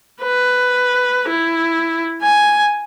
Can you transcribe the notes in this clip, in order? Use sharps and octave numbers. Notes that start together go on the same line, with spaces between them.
B4
E4
G#5